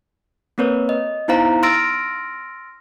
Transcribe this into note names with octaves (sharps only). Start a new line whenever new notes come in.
A#3 C4 A#4 B4 C#5
D#5
B3 D#4 E4 C5 F5 A#5
C6 E6 F6 A6 A#6 D7